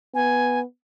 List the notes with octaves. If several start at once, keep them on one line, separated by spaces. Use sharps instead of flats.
B3 G#5